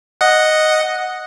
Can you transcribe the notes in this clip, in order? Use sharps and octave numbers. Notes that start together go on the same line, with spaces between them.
D#5 F#5